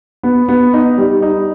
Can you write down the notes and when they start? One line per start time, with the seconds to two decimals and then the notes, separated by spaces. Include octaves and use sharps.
0.23 B3
0.49 B3
0.74 D#4
0.98 G3
1.22 D#4